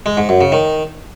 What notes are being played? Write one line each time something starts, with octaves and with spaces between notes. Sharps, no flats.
G#3
G#2
F#2
C#3
D#3